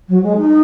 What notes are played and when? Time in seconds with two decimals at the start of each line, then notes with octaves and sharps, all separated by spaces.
0.09 F#3
0.23 G#3
0.37 D#4